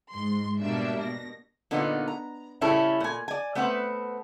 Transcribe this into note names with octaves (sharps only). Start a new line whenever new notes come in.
G#2 C6
B2 G3 A#3 D4 E5
B2 A#6
A#2 D3 B3 D#4 F4
A#5
C#3 G3 C#4 E4 A4
A#2 G#5
D5 G#5
A3 B3 C4 B4 F#5